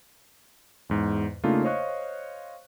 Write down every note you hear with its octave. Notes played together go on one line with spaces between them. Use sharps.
E2 G#2
C#3 A3 A#3 D4 D#4 F4
C5 C#5 D#5 F5 C#6 F#6